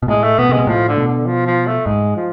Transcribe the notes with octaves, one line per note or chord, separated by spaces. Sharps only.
B2
A2 G#3
A3
B2 B3
C3 G#3
B2
A2 F3
D3
B2
D3
F3
F3
A3
G#2 G#3
F3